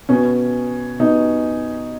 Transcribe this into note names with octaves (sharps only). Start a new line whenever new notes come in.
B2 C#4
B2 D#4